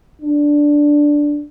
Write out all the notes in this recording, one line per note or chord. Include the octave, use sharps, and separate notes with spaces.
D4